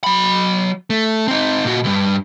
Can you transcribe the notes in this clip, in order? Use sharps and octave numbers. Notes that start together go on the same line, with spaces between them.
F#3 B5
A3
C4 D#4
A#2 F#4
C2 G2